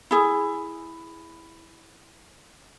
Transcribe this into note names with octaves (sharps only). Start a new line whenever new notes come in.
E4 G#4